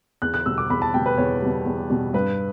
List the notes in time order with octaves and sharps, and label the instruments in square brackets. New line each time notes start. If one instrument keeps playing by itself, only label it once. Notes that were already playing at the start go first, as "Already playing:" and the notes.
[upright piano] E2 F#6
F#6
B2 G3 E6
D6
E2 B5
A5
B2 G3 G5
B4
E2 C#5
B2 G3
E2
B2 G3
G2 B4